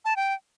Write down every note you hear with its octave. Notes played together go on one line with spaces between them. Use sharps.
A5
G5